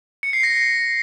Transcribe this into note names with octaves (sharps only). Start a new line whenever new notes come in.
C#7
C7
A#6